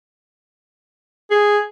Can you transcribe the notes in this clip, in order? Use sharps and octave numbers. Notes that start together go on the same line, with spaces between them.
G#4